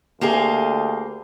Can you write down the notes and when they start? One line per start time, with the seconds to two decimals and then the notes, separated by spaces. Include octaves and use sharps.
0.21 D2 A#3 G4 G#4